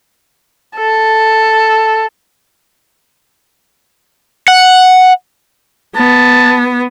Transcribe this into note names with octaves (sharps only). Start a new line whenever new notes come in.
A4
F#5
B3 A5